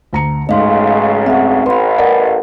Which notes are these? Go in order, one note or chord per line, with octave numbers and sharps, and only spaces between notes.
D2 A#5 C#7
B1 G#2 C#3 A3 D#5 F5 C6
C4 E5 F#5
A1 B4 B5 C6
A#4 D5 D#5 F#5